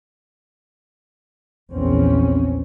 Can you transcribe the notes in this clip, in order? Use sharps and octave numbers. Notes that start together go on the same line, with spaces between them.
A#1 E2 C4 C#4